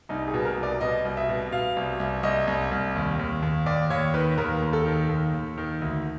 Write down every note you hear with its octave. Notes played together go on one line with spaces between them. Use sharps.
C2 D#4
G#4
B2
A#4
C2
D5
B2 D#5
C2
E5
B2
B2 F5
C2
C2
C2 D#5
C2
C2
D#2
D#2
D#2
D#2 D5
D#2 C#5
D#3 B4
D#2 A#4
D#2
A4
D#3
D#2
D#2
D#3
D2